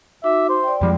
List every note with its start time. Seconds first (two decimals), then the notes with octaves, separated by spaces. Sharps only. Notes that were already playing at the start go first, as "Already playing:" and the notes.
0.24 D#4 F#4 E5 D6
0.49 C5
0.63 D5 G5
0.81 F2 F3 G3 G#3